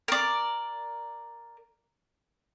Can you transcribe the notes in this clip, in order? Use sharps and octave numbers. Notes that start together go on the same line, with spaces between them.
A#4 D5